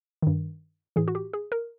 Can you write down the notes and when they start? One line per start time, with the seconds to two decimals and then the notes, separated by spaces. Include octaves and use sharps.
0.22 G2 D#3
0.96 A2 E3 G#4
1.08 F#4
1.15 G4
1.33 G#4
1.52 A#4